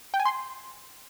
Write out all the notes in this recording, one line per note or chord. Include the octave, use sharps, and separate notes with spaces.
G5
G#5
C6